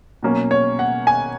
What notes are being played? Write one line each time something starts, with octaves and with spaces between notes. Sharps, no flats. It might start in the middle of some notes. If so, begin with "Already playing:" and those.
B2 F#3 A#3 C#4
C#5
F#5
G#5